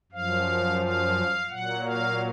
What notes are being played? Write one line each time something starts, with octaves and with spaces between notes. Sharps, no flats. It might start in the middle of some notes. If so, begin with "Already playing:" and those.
F#2 F3 F5
F5
A#2 F#3 F#5
F5